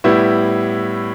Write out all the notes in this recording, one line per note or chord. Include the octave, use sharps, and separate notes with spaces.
A2 G3 B3 E4